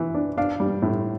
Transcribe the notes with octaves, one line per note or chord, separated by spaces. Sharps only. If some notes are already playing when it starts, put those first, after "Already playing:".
Already playing: E3
D4
D4 F5
G3
A2